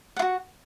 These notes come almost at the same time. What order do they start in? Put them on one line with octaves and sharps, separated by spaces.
F#5 F4 F#4